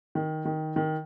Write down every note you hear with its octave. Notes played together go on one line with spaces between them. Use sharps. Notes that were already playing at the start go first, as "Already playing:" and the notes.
D#3
D#3
D#3